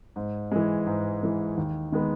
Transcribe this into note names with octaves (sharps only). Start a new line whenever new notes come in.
G#2
E3 G#3
G#2
E3 G#3
D#2
D#3 G#3 B3